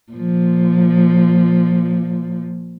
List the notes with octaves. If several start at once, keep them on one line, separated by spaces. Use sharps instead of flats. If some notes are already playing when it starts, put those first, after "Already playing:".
A#2 F3